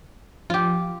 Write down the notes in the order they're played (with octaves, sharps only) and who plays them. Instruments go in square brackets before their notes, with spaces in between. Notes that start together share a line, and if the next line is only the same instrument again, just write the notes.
[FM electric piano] F3 [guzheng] F4 G4